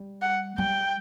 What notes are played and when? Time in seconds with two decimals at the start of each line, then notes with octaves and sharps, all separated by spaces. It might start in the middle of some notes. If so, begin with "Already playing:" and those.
Already playing: G3
0.22 F#5
0.58 G3 G5